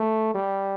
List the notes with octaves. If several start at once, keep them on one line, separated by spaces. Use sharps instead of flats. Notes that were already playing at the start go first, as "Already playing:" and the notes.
Already playing: A3
G3